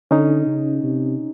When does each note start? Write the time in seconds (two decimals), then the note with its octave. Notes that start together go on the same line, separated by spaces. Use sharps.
0.11 D3 C#4 D#4
0.47 C#3
0.83 C3